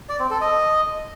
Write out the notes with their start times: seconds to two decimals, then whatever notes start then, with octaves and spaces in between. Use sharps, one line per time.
0.09 D5
0.20 C4
0.30 A4
0.41 D#5